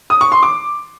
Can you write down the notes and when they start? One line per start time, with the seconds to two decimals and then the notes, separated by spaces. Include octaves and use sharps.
0.10 D#6
0.21 C#6
0.32 C6
0.43 D6